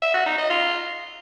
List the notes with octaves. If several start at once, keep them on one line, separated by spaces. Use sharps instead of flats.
E5
F#4
D#4
D#5
F4